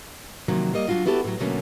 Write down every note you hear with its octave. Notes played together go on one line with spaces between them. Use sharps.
C3 D#3 F3 F#3 A#3
G3 A#3 D#5
F#3 G#3 D4 F4 F#4
B3 E4 F#4 G4 A4
A2 F#3
B2 D3 F#3 A3 A#3 C#4